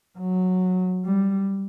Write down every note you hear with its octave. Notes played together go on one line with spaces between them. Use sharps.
F#3
G3